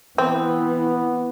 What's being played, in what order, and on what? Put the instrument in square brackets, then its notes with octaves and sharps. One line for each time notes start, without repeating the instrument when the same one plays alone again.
[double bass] E3 [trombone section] B3 [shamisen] C4